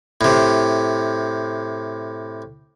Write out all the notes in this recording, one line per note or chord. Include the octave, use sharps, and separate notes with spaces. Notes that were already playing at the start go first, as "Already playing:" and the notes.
A2 C3